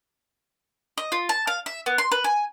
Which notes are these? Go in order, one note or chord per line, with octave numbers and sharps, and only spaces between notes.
D#5
F4
A5
F5
E5
B3
C6
B4
G#5